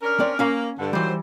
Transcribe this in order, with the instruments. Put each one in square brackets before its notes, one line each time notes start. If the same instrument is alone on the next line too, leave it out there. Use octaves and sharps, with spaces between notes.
[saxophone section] C#4 D4 A#4
[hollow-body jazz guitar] C4 D5
[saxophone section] A#3 [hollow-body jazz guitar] C#4 F5 A#5
[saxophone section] G2 D3
[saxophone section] D#3 F#3 C5 [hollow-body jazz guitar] E3 G3